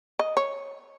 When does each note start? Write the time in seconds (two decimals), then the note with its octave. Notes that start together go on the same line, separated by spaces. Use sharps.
0.19 D#5
0.37 C#5